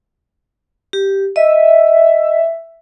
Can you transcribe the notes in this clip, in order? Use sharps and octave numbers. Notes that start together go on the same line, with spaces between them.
G4
D#5 E5